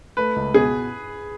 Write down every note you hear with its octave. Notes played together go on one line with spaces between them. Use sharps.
A3 B4
C#2
B2 G#4